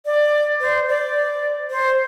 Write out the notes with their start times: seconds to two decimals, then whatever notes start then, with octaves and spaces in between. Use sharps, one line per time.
0.06 D5
0.61 C5
0.89 D5
1.70 C5